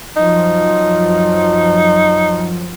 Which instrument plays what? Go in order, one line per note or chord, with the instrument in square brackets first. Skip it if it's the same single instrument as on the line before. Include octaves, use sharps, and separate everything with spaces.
[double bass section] F#2 F3 F#3 [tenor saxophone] D#4